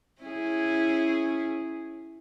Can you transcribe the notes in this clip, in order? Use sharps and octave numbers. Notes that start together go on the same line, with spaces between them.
C#4 E4 G#4